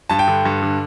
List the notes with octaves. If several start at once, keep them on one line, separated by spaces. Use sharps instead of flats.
G2 A5
G5
D3
G2
D3